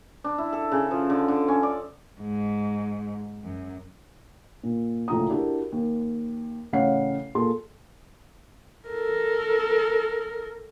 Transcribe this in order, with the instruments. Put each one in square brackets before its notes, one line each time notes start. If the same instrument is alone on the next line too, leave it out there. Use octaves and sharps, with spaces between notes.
[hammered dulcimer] D4
E4
A4
C#3
F3
D3
D3
C#4
D5
[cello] G#2
F#2
[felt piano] A#2
F#1 D2 A2 F3 A#5 D#6
D4 E4 F#4 G4 A#4
D#2
A1 C#3 C#5 F5 F#5 C7
A#2 G#4 A4 C6
[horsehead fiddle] A4 A#4